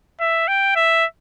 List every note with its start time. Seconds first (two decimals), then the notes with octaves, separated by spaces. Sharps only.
0.20 E5
0.48 G5
0.76 E5